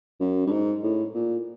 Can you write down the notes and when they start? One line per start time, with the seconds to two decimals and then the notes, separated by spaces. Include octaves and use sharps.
0.20 F#2
0.46 G2
0.51 G#2
0.83 A2
1.14 A#2